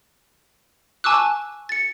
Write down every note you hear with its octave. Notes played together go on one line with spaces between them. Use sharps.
G#5 A5 C#6 D6 E6 F#6
A6 C#7